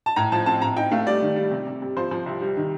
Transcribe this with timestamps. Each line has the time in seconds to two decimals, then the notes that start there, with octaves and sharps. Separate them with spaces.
0.06 A5
0.16 A2 A#5
0.32 F3 A5
0.46 C4 A5
0.62 A2 A#5
0.77 D#4 G5
0.91 A3 F5
1.06 G3 D5
1.22 D#3
1.36 G3
1.51 C3
1.67 C3
1.82 C3
1.97 F3 C5
2.11 F3
2.26 C2
2.41 G3
2.57 D#3